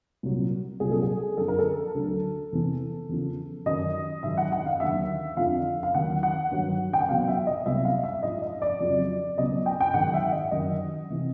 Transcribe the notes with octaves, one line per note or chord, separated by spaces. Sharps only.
C2 A#2 F#3
C2 A#2 F#3 G#4
A4
G#4
F#2 D3 F3 A4
A#4
A4
D2 D3 F#3
E2 C3 E3
E2 C#3 F3
F#2 D#3 F#3 D#5
G#2 D#3 F#3 E5
F#5
F#5
F5
D#2 D3 F#3 E5
F2 D3 F3 F5
F5
D#2 D#3 F#3 F#5
F#5
G2 D#3 F#3
G5
F#5
E2 B2 F#3 F5
E5
D#5
C2 B2 F#3 E5
F5
E5
G#2 F3 D#5
D#5
D5
F2 C#3 F#3
C#2 B2 F#3 D#5
G5
G5
G#2 D#3 F#3 F#5
E5
D#5
F#2 D#3 F#3 D#5
C3 E3